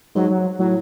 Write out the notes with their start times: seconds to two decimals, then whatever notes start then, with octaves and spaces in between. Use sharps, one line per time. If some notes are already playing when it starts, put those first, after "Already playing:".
0.15 G#2 F#3
0.30 F#3
0.59 A2 F#3